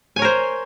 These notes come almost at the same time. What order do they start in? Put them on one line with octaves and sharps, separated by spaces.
G#5 C#5 A#4 C5